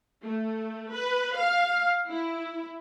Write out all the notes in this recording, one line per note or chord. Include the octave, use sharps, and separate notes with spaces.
A3
B4
F5
E4